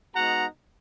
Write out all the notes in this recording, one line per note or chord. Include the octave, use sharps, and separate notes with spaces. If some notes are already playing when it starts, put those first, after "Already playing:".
G#3 B3 D#4 F#4 F#5 A#5